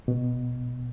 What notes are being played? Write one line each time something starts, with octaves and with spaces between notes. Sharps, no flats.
B2